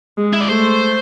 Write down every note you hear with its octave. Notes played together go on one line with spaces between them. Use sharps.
G#3
E4
D5
A3 C5